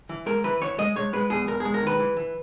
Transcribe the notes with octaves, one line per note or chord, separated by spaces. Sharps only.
E3
G#3 A#4
E3 B4
E3 C#5
G#3 D#5
G#3 C#5
G#3 B4
E2 G#4
E2 A#4
G#4
G#3
A#4
D#3 B4
E3
E3